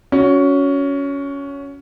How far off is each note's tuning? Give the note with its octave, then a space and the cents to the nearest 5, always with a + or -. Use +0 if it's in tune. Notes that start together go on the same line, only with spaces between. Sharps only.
C#4 +15 F#4 -15